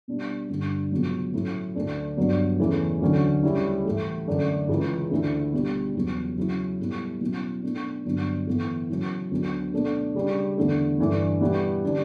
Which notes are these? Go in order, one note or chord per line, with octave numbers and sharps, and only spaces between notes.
B2 G3 D4
G2 D3 G3 D4
C#2 B2 F#3
A2 F#3 C#4 E4
D2 D3 A3 D4
G2 F#3 B3 D4
E2 C#3 E3 A3 C#4
D2 D3 F#3 C#4
D2 C#3 G3 C#4 E4
A2 E3 A3
F#2 D3 A3 D4
C#2 C#3 E3
D2 D3 A3 E4
B2 G3 D4
E2 C#3 F#3 B3
C#3 F#3 C#4 E4
A2 G3 B3 E4
B2 F#3 C#4 E4
B2 A3 D4
G2 D3 F#3 B3 D4
A2 E3 B3
C#3 F#3 C#4 E4
D2 D3 F#3 B3
B2 A3 D4
C#3 G3 D4
E2 D3 A3 E4
G2 E3 A3 D4
B2 G3 B3 E4
D3 G3 D4